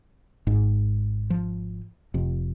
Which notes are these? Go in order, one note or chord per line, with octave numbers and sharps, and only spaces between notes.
G#1 G#2
F3
F1 F2 C3